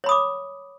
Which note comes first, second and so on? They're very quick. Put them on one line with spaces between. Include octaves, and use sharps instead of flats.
C#5 B5 D#6 D6